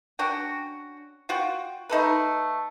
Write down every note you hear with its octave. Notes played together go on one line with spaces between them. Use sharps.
C#4 D4 F#4 G5
F4 F#4 G5
A3 D#4 A4 B4